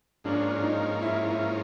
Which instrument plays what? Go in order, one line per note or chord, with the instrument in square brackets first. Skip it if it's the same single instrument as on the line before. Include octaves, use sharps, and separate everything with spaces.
[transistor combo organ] G#2 F3 A#3 C#4 [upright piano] D4
[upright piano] D4
D#4
E4
E4